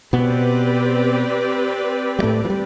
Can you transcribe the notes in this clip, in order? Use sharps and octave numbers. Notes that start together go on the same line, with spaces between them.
B2 B3 C4 G4 B4 D5
G3
A2 A3
F3
G3